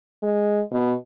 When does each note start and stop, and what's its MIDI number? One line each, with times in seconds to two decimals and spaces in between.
0.23 0.61 56
0.71 0.93 47